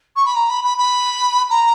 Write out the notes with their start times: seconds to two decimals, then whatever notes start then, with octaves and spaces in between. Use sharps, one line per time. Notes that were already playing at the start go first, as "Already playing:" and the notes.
0.16 C#6
0.25 B5
0.35 A#5
0.49 B5
0.64 B5
0.77 B5
1.50 A#5